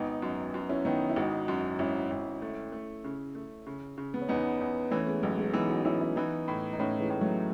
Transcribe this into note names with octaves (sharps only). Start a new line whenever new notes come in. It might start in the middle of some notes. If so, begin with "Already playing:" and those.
Already playing: G#1 B3 D#4
F#2
F#2
C#4 E4
D#3 B3 D#4
E4
G#1 D#4 F#4
F#2
G#1 C#4 E4
G#1
A3
A3
C#3
A3
C#3
C#3
B3
C#4
E2 B3 D#4
E2
E3 A3 C#4
G#3 B3
A1 F#3 A3
G#3 B3
E3 B3 D#4
D#4 F#4
E3 C#4 E4
C#4 E4
E3 B3 D#4
A2
D#4
A2 A3 C#4
E3 G#3
A2
F#3 A3